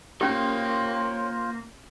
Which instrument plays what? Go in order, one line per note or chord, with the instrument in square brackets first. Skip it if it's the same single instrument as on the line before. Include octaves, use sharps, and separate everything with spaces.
[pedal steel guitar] A#3 [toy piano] C#4 G4 [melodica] F4 C5 [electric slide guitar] C#5 G5